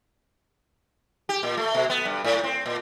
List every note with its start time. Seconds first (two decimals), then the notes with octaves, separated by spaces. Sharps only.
1.29 G4
1.43 A#2
1.57 A3
1.74 B2
1.90 B3
2.05 G2
2.24 A2
2.44 C4
2.66 A#2